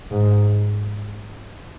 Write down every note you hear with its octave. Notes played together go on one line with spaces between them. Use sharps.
G#2